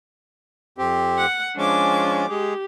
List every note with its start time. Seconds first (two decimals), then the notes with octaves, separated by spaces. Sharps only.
0.78 F2 C4 G4
1.18 F#5
1.57 F3 G#3 C#4 D4 D6
2.29 G#3 G4 G#4